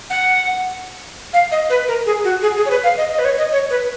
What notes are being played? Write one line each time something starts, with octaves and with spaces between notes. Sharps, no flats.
F#5
F5
D#5
B4
A#4
G#4
F#4
G#4
G#4
C#5
B4
F5
D#5
D#5
B4
C#5
D#5
C#5
B4